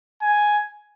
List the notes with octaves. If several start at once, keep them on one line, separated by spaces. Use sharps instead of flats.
G#5